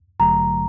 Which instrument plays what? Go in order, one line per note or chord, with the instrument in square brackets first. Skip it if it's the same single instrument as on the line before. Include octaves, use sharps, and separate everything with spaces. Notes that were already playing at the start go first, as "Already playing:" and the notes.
[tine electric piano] A1 G2 D3 F#3 A3 [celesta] A#5